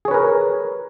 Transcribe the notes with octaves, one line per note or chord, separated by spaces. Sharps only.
G#4 A#4 B4 C#5